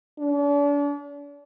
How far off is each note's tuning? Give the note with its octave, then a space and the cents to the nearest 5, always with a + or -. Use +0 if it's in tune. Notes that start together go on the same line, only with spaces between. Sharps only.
D4 -40